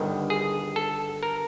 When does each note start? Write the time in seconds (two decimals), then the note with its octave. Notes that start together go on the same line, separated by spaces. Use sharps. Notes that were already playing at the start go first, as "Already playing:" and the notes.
Already playing: G1 G2 D#3
0.30 G#4
0.76 A4
1.23 A#4